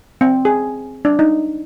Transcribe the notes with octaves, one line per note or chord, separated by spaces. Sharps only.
C4
G#4
D4
D#4